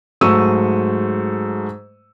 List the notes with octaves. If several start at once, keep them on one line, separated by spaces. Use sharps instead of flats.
G#2 F#3 A3 C#6 E6 D#7